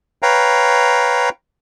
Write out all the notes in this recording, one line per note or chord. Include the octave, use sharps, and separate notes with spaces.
B4 C#5 F5 G5 A#5